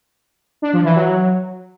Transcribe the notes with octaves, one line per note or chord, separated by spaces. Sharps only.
D4
F3
E3
F#3